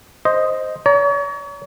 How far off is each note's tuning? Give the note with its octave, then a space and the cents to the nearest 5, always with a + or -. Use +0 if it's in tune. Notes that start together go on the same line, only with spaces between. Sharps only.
C5 +0 D#5 +0
C#5 +40 A#5 +0